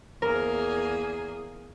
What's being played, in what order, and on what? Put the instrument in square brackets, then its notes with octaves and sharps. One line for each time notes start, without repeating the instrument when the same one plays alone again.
[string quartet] E2 A#3 G#4 [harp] A#4